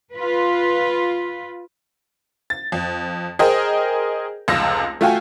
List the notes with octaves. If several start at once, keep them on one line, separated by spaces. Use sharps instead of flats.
F4 B4
A6
F2
G#4 A#4 C5 D#5 G5
F1 C#2 E6 A#6
A3 F4 F#4 F5 G5 G#5